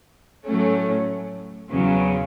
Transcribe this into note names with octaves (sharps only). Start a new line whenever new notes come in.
A2 F#3 A3 C#4
E2 C#3 F#3